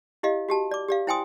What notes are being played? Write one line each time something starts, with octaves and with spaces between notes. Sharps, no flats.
E4 G4 D#5 F5
F#4 G4 A5
D5 D6
G4 D5 F5
E4 C5 G5 G#5 C6 D#6